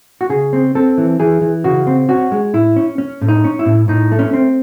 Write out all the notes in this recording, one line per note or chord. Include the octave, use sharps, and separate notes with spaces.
F#4
C#3 G#4
C4
C4 A4
E3
E3 G#4
E3
C#3 F#4
C4
C#4 F#4
G#3
A2 E4
C#4
C#4
A2
D#4
C#4
E4
A2
A2 D#4
A3
C#4
C4